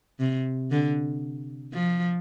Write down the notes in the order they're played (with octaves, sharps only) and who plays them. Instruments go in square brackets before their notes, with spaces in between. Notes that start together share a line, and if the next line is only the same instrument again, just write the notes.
[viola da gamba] C3
D3
F3